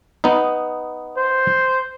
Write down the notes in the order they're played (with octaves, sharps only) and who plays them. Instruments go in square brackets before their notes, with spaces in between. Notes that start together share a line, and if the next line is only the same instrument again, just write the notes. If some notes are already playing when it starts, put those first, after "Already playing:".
[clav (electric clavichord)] B3 D#4
[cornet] C5